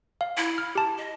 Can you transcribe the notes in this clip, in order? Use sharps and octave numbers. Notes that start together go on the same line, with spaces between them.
F5
E4
F6
G4 A5
D#5